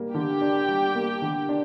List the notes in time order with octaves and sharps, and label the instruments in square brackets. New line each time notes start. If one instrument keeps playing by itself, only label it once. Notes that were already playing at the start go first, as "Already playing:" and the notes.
Already playing: [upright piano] G3 A#3
[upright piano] D3 [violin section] G4 G5
[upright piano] D4
G3
A#3
D3
D4